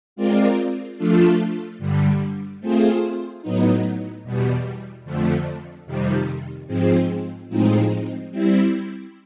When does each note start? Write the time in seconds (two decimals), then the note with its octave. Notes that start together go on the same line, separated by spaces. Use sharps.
0.16 G#3 C4 F4 A#4 D5
0.97 F3 A3 D4 F4 A4
1.79 G2 D3 G3
2.60 A3 C4 F4 G#4 C5
3.42 A2 F#3 B3 D#4
4.24 E2 B2 G3
5.05 F2 D3 F3 A3
5.86 F2 C3 D#3 G3
6.67 G#2 F3 G#3 C4
7.49 A2 F3 G#3 C4 D#4
8.31 G3 C4 E4